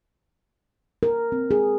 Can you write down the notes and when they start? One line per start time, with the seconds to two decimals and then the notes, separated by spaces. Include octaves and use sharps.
1.03 A#4
1.32 C4
1.51 G#4